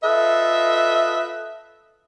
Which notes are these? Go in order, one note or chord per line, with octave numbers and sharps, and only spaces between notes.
F4 A4 B4 D#5 E5